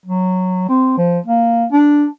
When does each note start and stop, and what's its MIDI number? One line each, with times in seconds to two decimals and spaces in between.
0.06 0.64 54
0.69 0.94 60
0.98 1.19 53
1.26 1.65 58
1.72 2.06 62